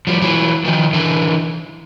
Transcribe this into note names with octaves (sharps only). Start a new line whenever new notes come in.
F3 G3
E3 F#3
D#3 F3
D3 E3